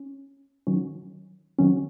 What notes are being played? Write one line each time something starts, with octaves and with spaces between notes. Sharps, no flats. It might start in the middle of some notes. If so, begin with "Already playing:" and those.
Already playing: C#4
D#3 F#3 C#4
D#3 F#3 C#4